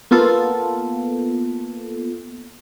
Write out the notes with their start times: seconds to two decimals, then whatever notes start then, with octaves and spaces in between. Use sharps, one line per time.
0.11 A#3 B3 F4 A4